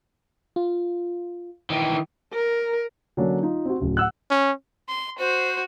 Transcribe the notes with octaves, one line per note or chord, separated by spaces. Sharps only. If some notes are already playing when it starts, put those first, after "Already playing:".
F4
D#3 E3
A#4
D3 F#3 A#3 C#4 D4
D#4 F4
C4 F#4
D1 C#3
F#5 E6 F#6
C#4
C6
F#4 C5